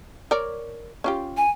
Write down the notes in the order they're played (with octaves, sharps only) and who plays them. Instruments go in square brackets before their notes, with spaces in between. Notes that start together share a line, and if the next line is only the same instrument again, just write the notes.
[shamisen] A#4 C#5 D5
C#4 F4 G4
[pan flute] G#5